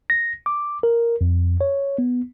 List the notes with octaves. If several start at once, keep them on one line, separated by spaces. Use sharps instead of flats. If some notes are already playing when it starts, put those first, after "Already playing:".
A#6
D6
A#4
F2
C#5
B3